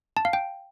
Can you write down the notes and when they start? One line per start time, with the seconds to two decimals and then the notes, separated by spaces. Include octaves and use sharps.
0.17 A5
0.25 F5
0.33 G5